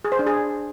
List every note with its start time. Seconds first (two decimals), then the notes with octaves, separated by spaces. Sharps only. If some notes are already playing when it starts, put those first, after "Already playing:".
0.05 G#4
0.12 C5
0.19 D4
0.27 G#4